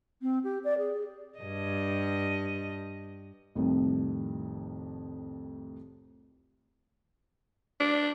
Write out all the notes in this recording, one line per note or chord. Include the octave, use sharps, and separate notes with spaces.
C4
G4
D5
G#4
G2 D#5
C2 F2 A2 D#3
D4